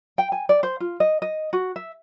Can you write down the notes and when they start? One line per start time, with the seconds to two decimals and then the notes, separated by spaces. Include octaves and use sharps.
0.18 G5
0.32 G#5
0.49 D5
0.63 C5
0.80 F4
1.00 D#5
1.22 D#5
1.53 F#4
1.76 E5